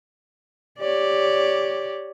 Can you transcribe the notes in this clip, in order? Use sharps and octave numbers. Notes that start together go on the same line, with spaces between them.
G4 C#5 D5